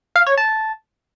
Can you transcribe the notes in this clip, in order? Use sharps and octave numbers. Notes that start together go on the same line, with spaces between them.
F5
C#5
A5